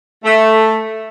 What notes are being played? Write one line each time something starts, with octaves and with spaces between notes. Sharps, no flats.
A3